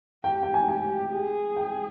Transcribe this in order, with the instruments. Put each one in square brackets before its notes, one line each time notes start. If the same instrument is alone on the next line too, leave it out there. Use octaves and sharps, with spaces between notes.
[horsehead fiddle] G4 [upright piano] G5
[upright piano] G5
G#5
[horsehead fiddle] G4 [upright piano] G#5
[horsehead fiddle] G#4
[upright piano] G5